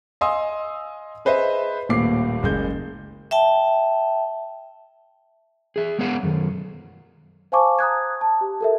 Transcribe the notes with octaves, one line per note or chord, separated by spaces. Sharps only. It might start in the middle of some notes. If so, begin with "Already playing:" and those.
D#5 F5 G#5 C6 D#6 E6
G#4 B4 C5 D#5 E5
D#1 D#2 A2 D6 C7
F#1 G#3 G6
E5 G5 A5
G#4 E5
G#3 B3 A#4 C#5 F5 F#5
F#2 D#3
C5 F5 G#5 A5 C#6 D6
A#5 D#6 F#6 G#6
A5
G4
A4 A#4 E5